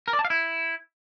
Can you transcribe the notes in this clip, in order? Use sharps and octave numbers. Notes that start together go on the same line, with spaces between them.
A#4
D5
A5
F5
E4